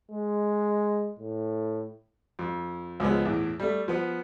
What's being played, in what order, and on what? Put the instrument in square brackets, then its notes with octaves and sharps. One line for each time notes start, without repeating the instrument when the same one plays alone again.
[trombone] G#3
A2
[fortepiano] F2
C#2 F3 G#3 B3
E2 A2
G3 A3
F3 B3